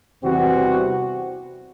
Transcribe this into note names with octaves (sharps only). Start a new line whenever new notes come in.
E2 C3 E3 G3 C4 F#4